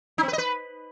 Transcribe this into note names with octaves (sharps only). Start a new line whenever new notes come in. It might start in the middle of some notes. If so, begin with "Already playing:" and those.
D#4
C4
B4
D#5
B4